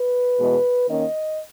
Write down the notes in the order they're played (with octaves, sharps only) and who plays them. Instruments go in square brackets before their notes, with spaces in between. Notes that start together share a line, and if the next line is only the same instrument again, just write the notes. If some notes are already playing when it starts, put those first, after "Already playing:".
Already playing: [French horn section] B4
E2 B2 G#3
D#3 A#3 C#4 D#5